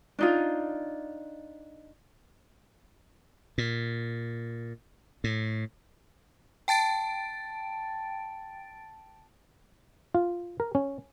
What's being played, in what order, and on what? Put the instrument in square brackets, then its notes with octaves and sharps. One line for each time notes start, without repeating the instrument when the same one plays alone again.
[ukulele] D4 D#4 F4
[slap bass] A#2
A2
[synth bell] G5 A5 A6 D7
[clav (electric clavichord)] F4
A#4
C#4